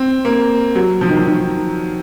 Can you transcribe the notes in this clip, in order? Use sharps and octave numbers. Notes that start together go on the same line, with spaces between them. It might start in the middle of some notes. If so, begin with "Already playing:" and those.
Already playing: C4
A#3
F#3
F3
D#3
F3
D#3